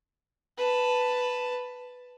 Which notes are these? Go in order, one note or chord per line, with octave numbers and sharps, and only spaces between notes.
B4 A5